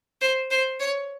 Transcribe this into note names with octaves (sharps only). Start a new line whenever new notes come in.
C5
C5
C#5